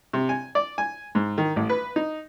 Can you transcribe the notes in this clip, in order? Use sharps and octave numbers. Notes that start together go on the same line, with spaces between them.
C3
G#5
D5
G#5
G#2
D#3
A1
B4
D#4